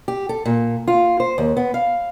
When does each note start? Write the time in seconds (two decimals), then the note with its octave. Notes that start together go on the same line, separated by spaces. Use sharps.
0.08 G4
0.29 A4
0.45 A#2
0.88 F4
1.20 C5
1.38 D#2
1.57 B3
1.74 F5